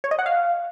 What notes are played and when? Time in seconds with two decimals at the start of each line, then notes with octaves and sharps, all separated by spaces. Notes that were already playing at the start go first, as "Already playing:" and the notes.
0.04 C#5
0.11 D#5
0.19 F#5
0.26 F5